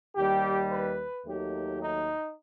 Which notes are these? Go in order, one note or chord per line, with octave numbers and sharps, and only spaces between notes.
D#2 D#3 G3 G4
B4
D#2 D#3 F#3 A3 G4
D#4